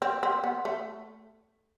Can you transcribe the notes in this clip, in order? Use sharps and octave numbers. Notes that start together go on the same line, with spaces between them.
C4
C4
B3
A3